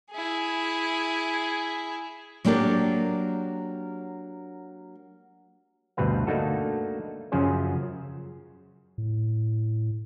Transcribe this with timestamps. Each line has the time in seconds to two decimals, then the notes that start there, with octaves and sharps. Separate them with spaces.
0.12 E4 G#4
2.45 F#3 A#3 D4 G4 A4
5.97 D2 G2 B2 C4 B4 F5
6.27 A3 A#3 D4 D#4 F#4 A4
7.32 F#2 C#3 F3 C#4 G#4 C5
8.98 A2